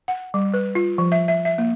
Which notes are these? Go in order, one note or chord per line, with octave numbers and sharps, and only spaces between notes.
F#5
G3
B4
F4
F3
E5
E5
E5
A#3